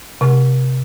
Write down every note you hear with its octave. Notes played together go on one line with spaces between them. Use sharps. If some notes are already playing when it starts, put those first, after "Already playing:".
C3